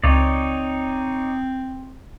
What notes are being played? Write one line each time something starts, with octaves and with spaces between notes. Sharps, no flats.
C#2 C4 D#4 C#5 D5